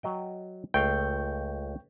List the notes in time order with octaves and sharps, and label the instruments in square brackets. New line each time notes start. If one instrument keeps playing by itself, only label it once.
[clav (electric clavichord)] F#3 D#5 G5
[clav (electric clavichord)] C#2 A3 F5 [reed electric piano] G5 C#6 G6